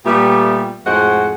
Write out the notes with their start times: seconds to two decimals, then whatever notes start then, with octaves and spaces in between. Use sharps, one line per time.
0.05 A#2 G3 A3 B3 G4
0.86 F2 A2 G#3 F#4 C5 F#5